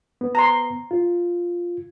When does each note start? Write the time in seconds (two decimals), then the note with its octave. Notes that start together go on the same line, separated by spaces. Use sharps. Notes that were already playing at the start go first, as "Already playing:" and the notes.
0.21 B3
0.35 A#5 C6
0.91 F4